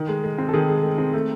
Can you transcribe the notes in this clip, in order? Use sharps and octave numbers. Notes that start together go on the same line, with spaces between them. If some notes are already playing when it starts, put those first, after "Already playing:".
Already playing: D#3
G#3
G#3
C4
A4
D#3 G#4
G#3
G#3
C4
A3